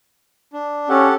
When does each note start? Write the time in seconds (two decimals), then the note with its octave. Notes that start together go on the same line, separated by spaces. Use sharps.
0.53 D4
0.89 C#4 G4 A4 F#5